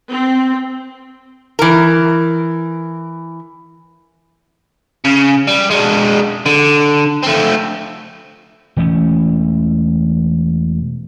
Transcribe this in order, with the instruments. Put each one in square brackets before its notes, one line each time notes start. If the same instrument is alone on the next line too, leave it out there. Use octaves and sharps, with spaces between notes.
[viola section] C4
[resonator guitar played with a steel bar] E3 A#4
[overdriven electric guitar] C#3
G3
G#3 D4
D3
A3 C4
[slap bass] E1 E3 A3 C#4